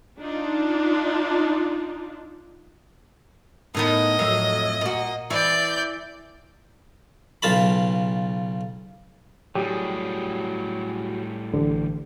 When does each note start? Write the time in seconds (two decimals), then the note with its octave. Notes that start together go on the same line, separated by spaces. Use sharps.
0.19 D4 D#4 F4
3.75 A2 D#3 B3 D#5
4.19 F2 A2 F#3
4.81 A#2 F#4
5.30 E3 D5 G6
7.42 B1 C#3 F4 A5 B5
9.55 A2 F#3 G3 G4 G#4
11.54 A1 D3